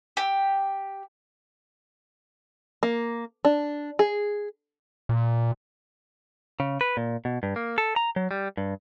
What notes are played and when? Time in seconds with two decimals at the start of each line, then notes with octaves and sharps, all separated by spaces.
0.17 G4
2.83 A#3
3.45 D4
3.99 G#4
5.09 A#2
6.60 C#3
6.81 B4
6.97 A#2
7.25 B2
7.43 G2
7.56 A#3
7.78 A4
7.96 A#5
8.16 F#3
8.31 G3
8.57 G2